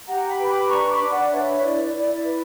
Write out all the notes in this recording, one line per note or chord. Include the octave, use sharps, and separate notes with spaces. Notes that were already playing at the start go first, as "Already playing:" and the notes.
G4 F#5 A#5
G5 B5
B4
B5 D6
D4 A#5 C#6
B5 D6
D4
D5 F#5
B4 C#5 E5
E4 D5
E4 D5
D5
B4